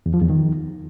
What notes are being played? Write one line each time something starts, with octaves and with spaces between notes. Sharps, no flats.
E2
F3
E2
D#3